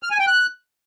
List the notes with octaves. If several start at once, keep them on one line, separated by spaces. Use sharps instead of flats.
F6
G#5
G5
F#6